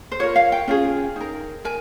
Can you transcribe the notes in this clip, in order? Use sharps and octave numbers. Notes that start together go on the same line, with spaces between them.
C5
F4 A#4 C#5
F5
G5
C#4 F4 G#4
D#4 A#4
A#4 G#5